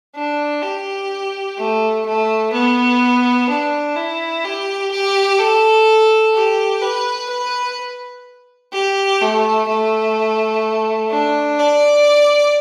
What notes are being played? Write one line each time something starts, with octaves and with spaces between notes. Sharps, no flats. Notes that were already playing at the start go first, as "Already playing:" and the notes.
D4
G4
A3
A3
B3
D4
E4
G4
G4
A4
G4
B4
B4
G4
A3
A3
D4
D5